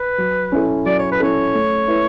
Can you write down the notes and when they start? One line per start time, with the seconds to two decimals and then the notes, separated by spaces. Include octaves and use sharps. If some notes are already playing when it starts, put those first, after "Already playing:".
Already playing: B4
0.18 F#3
0.52 C#4 E4 A4
0.86 F#3 D5
0.99 C#5
1.12 B4
1.20 C#4 E4 A4 C#5
1.54 A3
1.88 E4 B4